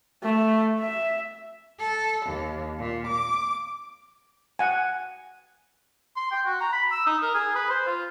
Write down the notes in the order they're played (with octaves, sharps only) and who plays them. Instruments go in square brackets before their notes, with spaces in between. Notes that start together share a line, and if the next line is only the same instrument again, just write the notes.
[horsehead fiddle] A3
E5
[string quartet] A4
D#2
A#2
D6
[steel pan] F#5 G#5
[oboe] C6
G5
F#4
A#5
B5
E6
D#4
A#4
G#4
B4
C5
F4